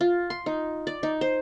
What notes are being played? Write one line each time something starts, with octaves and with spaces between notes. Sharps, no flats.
F4
C6
D#4
D5
D#4
C5